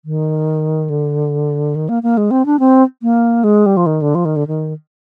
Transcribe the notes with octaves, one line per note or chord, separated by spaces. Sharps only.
D#3
D3
D#3
A#3
A#3
G#3
C4
D4
C4
A#3
G#3
G3
F3
D#3
D3
F3
D#3
D3
D#3